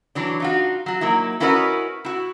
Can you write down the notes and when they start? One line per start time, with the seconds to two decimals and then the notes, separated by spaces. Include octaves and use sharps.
0.15 E3 F#3 D4
0.40 D#4 F4 F#4
0.86 F#3 F#4
1.01 F#3 A#3 D#4 E4
1.40 C#4 E4 F#4 A#4 B4 D#5
2.05 E4 F#4